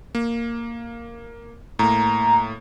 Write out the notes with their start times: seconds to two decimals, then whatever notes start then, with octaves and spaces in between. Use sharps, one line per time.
0.15 A#3
1.79 A2 A#3 A#5